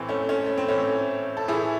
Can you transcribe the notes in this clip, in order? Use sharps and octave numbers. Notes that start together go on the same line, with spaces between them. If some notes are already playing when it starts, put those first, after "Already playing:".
Already playing: A2 E3 C4
A3 C#4
A3 C#4
A3
C4
A2 E3 A3 C#4
A4
A2 E3 E4 G#4